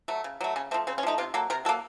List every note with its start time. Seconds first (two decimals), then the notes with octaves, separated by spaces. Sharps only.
0.08 F#3 A3
0.24 C#3
0.41 F#3 A3
0.56 C#3 C#4
0.71 F3 A3 C4
0.87 C#3 C4
0.98 C#4
1.03 F3 A3 D#4
1.18 C3 F4
1.34 F#3 A#3 A4
1.50 C3 A#4
1.65 F#3 A4
1.69 A#3